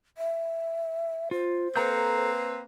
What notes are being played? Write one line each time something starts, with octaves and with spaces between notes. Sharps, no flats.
E5
F4 C5
A#3 C4 A4 B4 A#5 G6